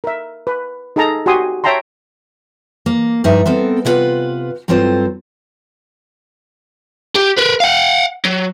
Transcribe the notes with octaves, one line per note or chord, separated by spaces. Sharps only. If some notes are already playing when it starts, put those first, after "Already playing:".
A#4 E5
B4
D#4 G#4 A4 A5 A#5
F#4 G4 G#5 C6 D#6
C#5 E5 G5 A5 A#5 C6
A#3
G2 F3 D#4 D5 E5
B3 C4 A4 A#4
C3 E4 F4 B4 F#5
G2 F#3 C4 F4 A4 C5
G4
A#4 B4
F5 F#5
F#3